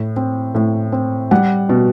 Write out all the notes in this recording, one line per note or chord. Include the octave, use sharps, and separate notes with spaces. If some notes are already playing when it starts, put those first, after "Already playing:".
Already playing: A2
C4
A2
C4
G3 F#5
B2